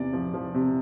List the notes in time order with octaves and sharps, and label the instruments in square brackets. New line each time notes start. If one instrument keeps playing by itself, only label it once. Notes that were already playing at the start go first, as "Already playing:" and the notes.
Already playing: [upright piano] E2 C3 D5
F3
F3
C3